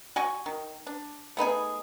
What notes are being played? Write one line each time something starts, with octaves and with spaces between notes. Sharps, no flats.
F#4 G#5 C#6
D#3
D4
A3 B3 D#4 G#4